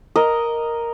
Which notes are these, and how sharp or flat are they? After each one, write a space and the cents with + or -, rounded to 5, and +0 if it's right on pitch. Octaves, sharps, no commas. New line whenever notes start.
A#4 +0 D#5 +0